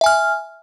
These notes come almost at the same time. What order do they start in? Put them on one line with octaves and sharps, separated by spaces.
E5 G#5 F6